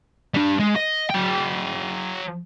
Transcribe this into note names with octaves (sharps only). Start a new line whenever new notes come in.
G3 D4
G#3
D#5
F#3 G5